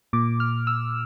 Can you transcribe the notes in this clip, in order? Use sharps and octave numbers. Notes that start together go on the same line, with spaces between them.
A#2 D6
F6
E6